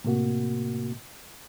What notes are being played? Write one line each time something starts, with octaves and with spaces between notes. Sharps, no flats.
A2 C3 A#3 F#4